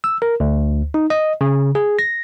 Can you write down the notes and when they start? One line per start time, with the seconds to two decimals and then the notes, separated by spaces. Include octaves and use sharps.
0.04 E6
0.22 A#4
0.40 D2
0.94 D#4
1.10 D#5
1.41 C#3
1.75 G#4
1.99 A#6